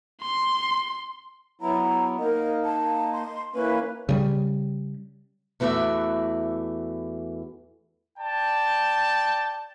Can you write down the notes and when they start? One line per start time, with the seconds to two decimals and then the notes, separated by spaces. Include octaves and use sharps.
0.22 C6
1.61 F#3 B3 E4 A#5
2.19 A#3 D#4 A#4 D#5
2.64 A5
3.13 C6
3.54 E3 A#3 C#4 B4
4.09 C#3 G3
5.60 E2 E3 A3 F#4 D5 E5
8.19 D5 G5 A5